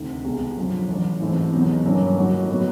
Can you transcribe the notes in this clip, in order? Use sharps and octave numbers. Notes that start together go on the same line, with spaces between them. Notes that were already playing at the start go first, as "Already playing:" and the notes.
Already playing: D2 C3 D#3
C2 B2 G#3
F#2 D3 F3
A1 A2 F#3
A1 G#2 E3 A3 C4
E2 B2 F#3 B3 D#4
G2 D#3 F#3 A#3 C#4
A2 F#3 A#3 D#4 F#4
A2 F#3 B3 D#4 F#4